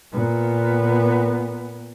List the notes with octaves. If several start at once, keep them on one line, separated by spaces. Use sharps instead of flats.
A#2 B3